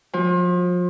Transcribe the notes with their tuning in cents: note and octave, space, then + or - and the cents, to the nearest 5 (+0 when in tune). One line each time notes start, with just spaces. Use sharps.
F3 +35